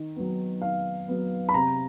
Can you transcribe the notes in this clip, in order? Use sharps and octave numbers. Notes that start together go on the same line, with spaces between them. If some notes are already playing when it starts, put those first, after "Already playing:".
Already playing: D#3
F#3 B3
D#3 F5
F#3 B3
B5
C3 A#5